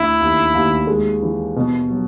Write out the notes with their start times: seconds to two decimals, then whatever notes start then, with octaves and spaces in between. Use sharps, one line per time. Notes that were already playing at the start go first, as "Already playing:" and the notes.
Already playing: D2 E4
0.20 D#2
0.54 D#2
0.87 G#3
1.22 E3
1.56 B2
1.90 F#3